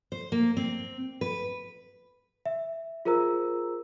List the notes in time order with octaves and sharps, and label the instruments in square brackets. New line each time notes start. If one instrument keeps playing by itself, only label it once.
[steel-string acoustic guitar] C5
A#3
C4
B4
[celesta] E5
F4 G#4 A#4 C5 A#5 E6